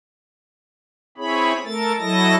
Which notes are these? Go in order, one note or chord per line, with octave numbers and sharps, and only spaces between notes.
C4 E4 G#4 C#5 B5
A3 A4 A#4 A6
F#3 E4 A4 D#5 A5 A#6